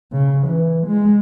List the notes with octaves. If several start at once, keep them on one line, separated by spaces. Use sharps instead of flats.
C#3
E3
G#3